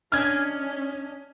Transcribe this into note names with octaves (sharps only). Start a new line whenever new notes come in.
C#4 D4 D#5 G#5 F6 G#6